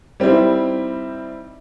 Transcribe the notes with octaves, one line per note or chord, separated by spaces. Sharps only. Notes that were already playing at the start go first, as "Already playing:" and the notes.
G3 C4 D#4 E4